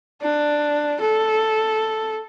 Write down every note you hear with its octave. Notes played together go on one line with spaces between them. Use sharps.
D4
A4